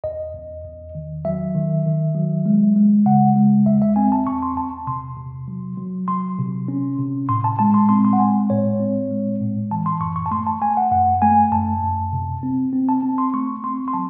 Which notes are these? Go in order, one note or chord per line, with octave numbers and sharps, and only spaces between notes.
E2 D#5
E2
E2
D#3
F#3 E5
D#3
D#3
F#3
G#3
G#3
C#3 F#5
G#3
E2 E5
E5
C4 G#5
A5
E2 C#6
C6
E2 A5
C3 C6
C3
F#3
F#3
F#3 C6
C3
C#4
C3
A2 C6
A5
G#3 A5
C6
C4 C6
C6
F#5
G#3 G#5
A2 C#5
C4
G#3
A2
E3 A5
C6
F#2 C#6
C#6
A5
A3 C6
A5
A3 G#5
F#5
F#2 F#5
A3 G#5
F#2 A5
F#2
C3
C4
C4
A5
C4
C6
A3 C#6
C4 C6
C6
F#3 A5